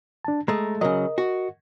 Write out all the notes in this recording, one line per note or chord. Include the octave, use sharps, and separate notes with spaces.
D4 A5
G#3 A3 A#5
C#3 F#3 A#4 D#5
F#4